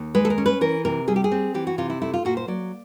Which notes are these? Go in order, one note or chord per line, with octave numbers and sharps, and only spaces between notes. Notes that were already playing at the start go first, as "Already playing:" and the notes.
Already playing: D#2
G#3 B4
A4
A#4
C#4
B4
E3 A#4
C3 A#4
G3 G#4
G4
G#4
C4
E3 G4
F#4
C3 F4
E4
A3 E4
F4
A#2 F#4
C5
F#3 D5